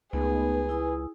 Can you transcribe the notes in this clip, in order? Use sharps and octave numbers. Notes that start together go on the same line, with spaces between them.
C#2 A3 B3 D#4 G#4 B4
E4 G#5 D#6